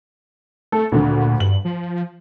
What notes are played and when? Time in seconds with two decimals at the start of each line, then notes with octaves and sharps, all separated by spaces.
0.72 A3 A4
0.92 D2 A#2 D3
1.40 G2 F#7
1.65 F3